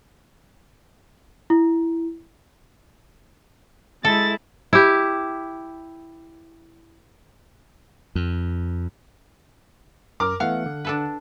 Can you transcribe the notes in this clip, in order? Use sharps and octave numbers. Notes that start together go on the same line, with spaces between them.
E4
G#3 E4 A4 A6
E4 G4
F2
F#2 A#4 D6 F6
E3 A3 B3 F5 F#5
D3
D4 A4 B4